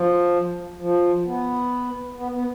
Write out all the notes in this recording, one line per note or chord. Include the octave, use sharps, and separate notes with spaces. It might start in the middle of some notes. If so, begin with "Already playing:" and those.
Already playing: F3
F3
B3
B3
B3